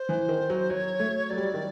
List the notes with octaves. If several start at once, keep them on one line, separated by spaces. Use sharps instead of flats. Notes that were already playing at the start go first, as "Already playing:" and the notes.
Already playing: C5
E3
D#3
F#3
F#3 C#5
A3
F#3 D5
G3
F#3
D#3